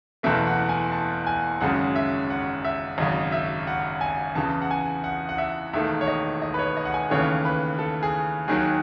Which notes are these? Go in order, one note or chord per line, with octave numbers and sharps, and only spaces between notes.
F#1 E2 B2 A3 E5
F#5
G#5
A5
G#5
G#1 F#2 C#3 G#3 C#4 F#5
E5
F#5
E5
G#1 F#2 C#3 D#5
E5
F#5
G#5
E2 C#3 E3 A5
F#5
G#5
F#5
F#5
E5
E1 D#2 D#3 A3 E5
C#5
D#5
D#5
B4
C#5
D#5
F#5
G#5
D#2 C#3 E3 A3 C#5
B4
A4
G#4
D#2 D#3 F#3 G#4